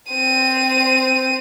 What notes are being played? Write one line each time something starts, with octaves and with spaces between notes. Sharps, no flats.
C4 D#7